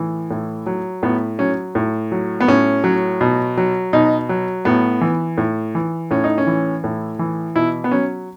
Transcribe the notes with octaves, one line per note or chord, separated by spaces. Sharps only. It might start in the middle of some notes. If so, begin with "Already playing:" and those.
Already playing: A2 E3
A2
F#3
A2 B3
F#3 C#4
A2
F#3
B3
A2 C#4
F#3
B2
F#3
B2 D#4
F#3
A2 B3
E3
A2
E3
A2 C#4
D#4
C#4
E3
A2
E3
B2 E4
B3
F#3 C#4